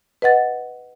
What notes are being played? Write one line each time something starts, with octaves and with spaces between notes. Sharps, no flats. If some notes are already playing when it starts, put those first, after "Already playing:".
B4 D#5 F#5 A6